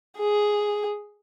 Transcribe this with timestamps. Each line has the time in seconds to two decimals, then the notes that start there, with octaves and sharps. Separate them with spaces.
0.18 G#4